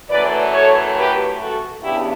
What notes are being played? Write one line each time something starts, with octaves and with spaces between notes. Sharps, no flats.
F#2 E3 A3 B4 D5
A4 C#5
G4 B4
F#4 A4
E2 C#3 E3 B3 D4 E4 G4